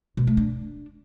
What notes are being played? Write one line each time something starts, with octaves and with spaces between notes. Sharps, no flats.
B2
A3
D4